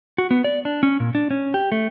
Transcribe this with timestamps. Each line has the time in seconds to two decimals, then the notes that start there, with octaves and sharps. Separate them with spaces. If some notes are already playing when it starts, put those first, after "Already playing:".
0.18 F#4
0.31 B3
0.44 D5
0.65 D4
0.83 C#4
1.00 A#2
1.15 D4
1.31 C#4
1.54 G4
1.72 A3